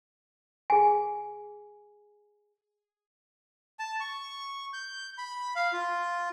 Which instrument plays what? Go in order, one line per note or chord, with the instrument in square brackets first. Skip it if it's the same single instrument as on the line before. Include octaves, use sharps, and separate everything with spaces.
[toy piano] G#4 G#5
[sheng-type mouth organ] A5
C#6
G6
B5
F5
F4